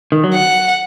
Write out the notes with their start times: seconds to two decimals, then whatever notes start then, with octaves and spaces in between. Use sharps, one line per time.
0.12 D#3
0.24 F#3
0.34 F#5